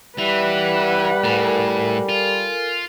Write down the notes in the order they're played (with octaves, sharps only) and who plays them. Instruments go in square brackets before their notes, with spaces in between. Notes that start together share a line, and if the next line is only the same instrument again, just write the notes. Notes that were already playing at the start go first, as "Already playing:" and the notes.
[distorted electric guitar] E3 [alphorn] G3 [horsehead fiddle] B4 F#5 [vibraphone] E5
[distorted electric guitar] A2 [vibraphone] A4 A#4 G#5
[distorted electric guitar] F4